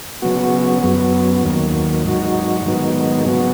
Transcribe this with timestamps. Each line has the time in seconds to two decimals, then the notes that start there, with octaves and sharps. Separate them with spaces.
0.22 C#3 F#3 B3 F#4
0.82 F#2 F#3 B3
1.44 D#2 D#3 F#3
2.04 G#2 F#3 D#4 F#4
2.64 G#2 D#3 F#3 B3 D#4
3.25 C#3 F#3 B3 F#4